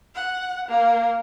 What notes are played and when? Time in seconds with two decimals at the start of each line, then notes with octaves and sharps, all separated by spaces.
0.15 F#5
0.68 A#3